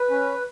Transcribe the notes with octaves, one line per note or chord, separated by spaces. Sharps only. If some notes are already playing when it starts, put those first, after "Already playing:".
Already playing: B4
C#4